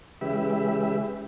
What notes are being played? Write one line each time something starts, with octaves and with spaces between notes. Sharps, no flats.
C#3 E3 G#3 G4 B4 E5